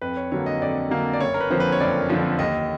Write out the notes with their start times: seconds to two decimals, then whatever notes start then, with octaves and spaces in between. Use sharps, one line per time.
0.01 F2 B4
0.17 C#5
0.32 D3 F#3 A#3 C#5
0.46 D#5
0.61 F2 D5
0.90 D3 F#3 A#3
1.13 D5
1.20 F#1 C#5
1.34 A#4
1.40 B4
1.50 F2 D3 F3 C5
1.60 B4
1.72 C#5
1.80 F#1 D5
2.09 F2 D3 F3
2.39 D#2 D#5